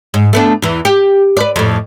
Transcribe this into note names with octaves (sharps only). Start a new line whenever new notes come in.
G#2
A3 B3 D4
E2 E3
G4
B4 D5
F2 A2